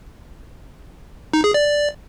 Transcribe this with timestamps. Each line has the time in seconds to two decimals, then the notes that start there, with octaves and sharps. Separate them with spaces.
1.33 D#4
1.44 G#4
1.54 D5
1.65 D5